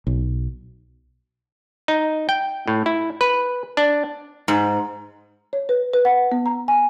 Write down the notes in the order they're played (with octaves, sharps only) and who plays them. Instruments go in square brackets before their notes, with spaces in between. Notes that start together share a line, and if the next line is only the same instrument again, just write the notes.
[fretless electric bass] B1
[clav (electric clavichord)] D#4
G5
A2
E4
B4
D4
[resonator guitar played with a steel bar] G#2
[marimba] C#5
B4
B4
F#5
B3
A#5
G#5